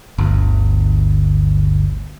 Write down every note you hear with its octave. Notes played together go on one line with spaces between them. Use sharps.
G1 D2